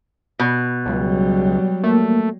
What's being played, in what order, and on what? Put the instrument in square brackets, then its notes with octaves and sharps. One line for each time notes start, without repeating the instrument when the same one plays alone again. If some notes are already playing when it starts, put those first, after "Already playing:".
[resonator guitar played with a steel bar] B2
[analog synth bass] C#2 [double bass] F#3 G3
[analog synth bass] A3 [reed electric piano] A#3